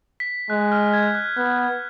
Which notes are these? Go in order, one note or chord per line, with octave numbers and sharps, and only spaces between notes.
B6
G#3 F#6
F6
G#6
F#6
B3 F#6
G#6